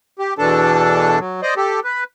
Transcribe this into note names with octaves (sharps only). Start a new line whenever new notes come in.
G4
E2 B2 E3 D4 A4 A5
F#3
C5 D5 D#5
G4 A4
B4